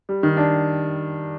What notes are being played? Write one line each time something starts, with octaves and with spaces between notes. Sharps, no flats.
G3
D#3
D4